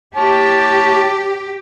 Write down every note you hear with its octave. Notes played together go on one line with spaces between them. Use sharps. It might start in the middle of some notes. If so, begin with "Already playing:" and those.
G4 C#5 A5